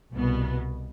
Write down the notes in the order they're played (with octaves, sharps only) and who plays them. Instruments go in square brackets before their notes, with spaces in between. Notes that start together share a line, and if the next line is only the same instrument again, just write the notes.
[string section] C2 B2 B3